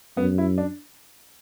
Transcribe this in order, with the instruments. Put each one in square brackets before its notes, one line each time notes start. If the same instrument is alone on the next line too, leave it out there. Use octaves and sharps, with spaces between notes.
[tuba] F#2 [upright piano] B3
[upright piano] E4
D4